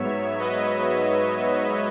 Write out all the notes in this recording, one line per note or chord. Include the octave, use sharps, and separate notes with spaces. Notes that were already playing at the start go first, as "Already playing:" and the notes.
Already playing: G#2 F#3 B3 C#5 E5
B4 D#5